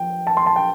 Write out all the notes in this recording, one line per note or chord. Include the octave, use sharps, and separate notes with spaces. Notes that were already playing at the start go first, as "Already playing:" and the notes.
Already playing: F3 G5
A5
C6
A5
G5